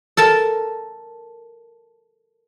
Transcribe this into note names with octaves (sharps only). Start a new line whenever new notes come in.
A4 A#4 A5